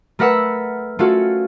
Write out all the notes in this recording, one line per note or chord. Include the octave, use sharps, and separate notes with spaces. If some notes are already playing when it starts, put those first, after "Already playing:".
A3 A#4 B4 F#5 E6
A3 C#4 F4 F#4 A4